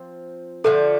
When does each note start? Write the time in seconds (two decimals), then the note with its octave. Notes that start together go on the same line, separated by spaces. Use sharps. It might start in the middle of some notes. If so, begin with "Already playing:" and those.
Already playing: F3 C4
0.64 D3 F3 A3 A4